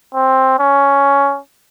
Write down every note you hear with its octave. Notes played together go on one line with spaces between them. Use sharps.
C4
C#4